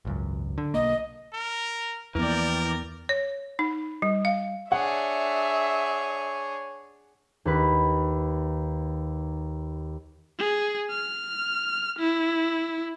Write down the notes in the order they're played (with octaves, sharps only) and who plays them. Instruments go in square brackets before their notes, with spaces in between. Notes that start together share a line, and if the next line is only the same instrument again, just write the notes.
[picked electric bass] G#1 C#2 F#2
D3
[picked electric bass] B1 A#3 [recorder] D#5
[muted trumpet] A#4
[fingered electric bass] E2 F3 B3 [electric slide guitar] E3 [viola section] A#3 D5 G5 [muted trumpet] A#4
[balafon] C#5
D#4
G3
F5
[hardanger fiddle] D4 G#4 [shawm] C#5 [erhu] E5 [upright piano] F#5
[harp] D#2 B4
[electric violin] G#4
F6
E4